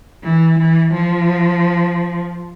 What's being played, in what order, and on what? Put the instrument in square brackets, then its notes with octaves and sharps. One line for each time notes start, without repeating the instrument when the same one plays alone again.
[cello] E3
E3
F3